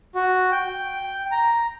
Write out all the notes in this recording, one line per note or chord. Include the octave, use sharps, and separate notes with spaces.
F#4
G5
A#5